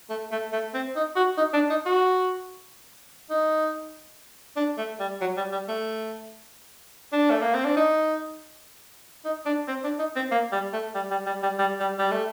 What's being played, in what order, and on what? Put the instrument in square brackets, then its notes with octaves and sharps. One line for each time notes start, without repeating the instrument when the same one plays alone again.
[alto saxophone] A3
A3
A3
C4
D#4
F#4
D#4
D4
D#4
F#4
D#4
D4
A3
G3
F#3
G3
G3
A3
D4
A3
A#3
C4
D4
D#4
D#4
D4
C4
D4
D#4
C4
A#3
G3
A3
G3
G3
G3
G3
G3
G3
G3
A3